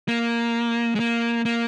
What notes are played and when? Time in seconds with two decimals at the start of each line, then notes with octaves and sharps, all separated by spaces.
0.08 A#3
0.95 G#3
1.00 A#3
1.45 A#3